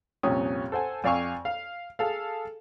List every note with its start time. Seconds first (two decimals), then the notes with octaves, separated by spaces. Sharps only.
0.23 C2 F2 A#2 C#4 D#6
0.72 A4 C5 F#5 G#5
1.04 F2 D5 F5 G#5 C#6 E6
1.45 F5
1.99 G#4 A4 F5